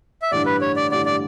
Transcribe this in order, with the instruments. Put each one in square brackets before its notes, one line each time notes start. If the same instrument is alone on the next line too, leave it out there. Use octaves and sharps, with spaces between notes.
[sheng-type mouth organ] E5
[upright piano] A1 G2 D3 [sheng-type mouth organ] D5
[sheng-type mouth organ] B4
C#5
D5
[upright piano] A1 G2 D3 [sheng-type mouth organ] D5
[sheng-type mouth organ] D5